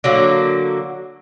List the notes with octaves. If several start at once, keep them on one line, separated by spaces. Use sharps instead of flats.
D3 F#3 A#3